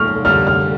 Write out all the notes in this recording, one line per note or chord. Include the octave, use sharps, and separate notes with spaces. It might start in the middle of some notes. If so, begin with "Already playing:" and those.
Already playing: G#2 F3 A#3 C#6 F6
D3 G3 A#3 F6
F6